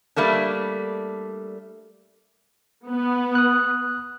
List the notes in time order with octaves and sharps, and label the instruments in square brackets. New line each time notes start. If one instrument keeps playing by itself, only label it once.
[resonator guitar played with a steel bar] G3 A3 A#3 D4
[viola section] B3
[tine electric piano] D#6 F#6